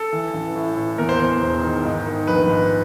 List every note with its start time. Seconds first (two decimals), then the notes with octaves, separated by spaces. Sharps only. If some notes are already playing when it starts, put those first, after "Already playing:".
Already playing: A4
0.13 E3
0.34 A1
0.56 A2
0.77 A2
0.98 E2 A#4
1.09 C5
1.20 E2 C5
1.42 E1
1.63 D#3
1.85 G#2
2.06 D#3
2.27 A#1 B4
2.49 G#2